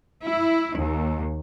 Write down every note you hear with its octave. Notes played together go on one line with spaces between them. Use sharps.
E4
D#2